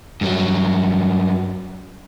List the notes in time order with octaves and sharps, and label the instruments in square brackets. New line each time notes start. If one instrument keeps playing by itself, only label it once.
[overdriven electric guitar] G2 F#3